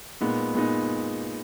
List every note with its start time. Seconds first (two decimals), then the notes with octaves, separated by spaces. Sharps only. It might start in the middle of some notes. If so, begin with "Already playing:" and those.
0.21 A#2 G#3 B3 D#4
0.54 A#2 G#3 B3 D#4